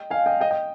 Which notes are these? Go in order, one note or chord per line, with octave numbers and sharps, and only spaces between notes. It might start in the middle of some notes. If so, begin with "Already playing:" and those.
Already playing: D#5 G5
F5 G#5
D#5 G5
D#5 G5
D#5 G5